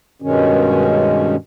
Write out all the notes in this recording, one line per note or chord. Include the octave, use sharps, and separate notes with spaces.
G2 B2 D#3 G#3 C#4